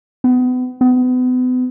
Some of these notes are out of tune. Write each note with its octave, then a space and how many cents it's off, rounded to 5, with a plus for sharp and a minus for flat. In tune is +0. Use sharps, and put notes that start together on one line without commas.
B3 +30
B3 +35